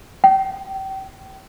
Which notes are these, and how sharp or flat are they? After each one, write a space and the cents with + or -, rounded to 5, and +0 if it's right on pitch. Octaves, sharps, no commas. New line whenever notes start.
G5 -30